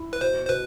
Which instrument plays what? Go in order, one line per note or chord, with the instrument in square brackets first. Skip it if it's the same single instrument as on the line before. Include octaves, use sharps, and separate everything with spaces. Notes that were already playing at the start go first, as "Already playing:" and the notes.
Already playing: [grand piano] E4
[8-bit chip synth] B4
[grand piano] B2 [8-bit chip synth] C5
[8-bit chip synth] C5
[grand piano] B2 [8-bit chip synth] B4